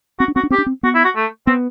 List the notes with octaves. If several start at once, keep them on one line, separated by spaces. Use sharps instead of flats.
C4 F#4
D4
C4 F#4
D4
C4 G4
D4
C4
B3 F#4
E4
F#4
A3
B3 C4